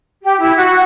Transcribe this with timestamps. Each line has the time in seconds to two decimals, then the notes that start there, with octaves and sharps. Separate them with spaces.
0.24 G4
0.39 E4
0.56 F#4